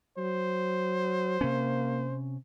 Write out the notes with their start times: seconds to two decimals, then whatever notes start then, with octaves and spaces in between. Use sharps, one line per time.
0.18 F#3 C5
1.41 C3 A#3 C#4